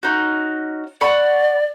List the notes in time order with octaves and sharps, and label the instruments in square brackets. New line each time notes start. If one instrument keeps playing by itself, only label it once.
[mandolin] C#4 D#4 F#4
[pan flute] D5 [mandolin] F#5 B5 C#6